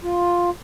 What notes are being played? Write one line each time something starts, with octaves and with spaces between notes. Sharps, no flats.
F4